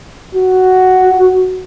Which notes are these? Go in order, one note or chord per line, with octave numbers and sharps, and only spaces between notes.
F#4